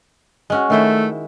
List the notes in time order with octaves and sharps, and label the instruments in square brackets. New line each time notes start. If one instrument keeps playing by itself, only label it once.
[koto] G#3 C#4 F#4
[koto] D#3 E4 C5 [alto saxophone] A3